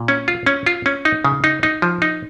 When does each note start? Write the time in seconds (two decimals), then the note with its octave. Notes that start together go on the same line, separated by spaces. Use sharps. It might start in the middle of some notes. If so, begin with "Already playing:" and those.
Already playing: A#2
0.08 C#4
0.28 F4
0.46 C#4
0.66 F4
0.86 C#4
1.05 D#4
1.25 C#3
1.44 D#4
1.63 D#4
1.82 F3
2.02 D#4